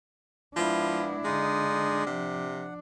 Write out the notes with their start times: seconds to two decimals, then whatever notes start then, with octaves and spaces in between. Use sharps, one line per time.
0.56 F3 G#3 B3 D4 E4
1.24 D3 G#3 D#4 F4 D#6
2.07 C3 F3 F#5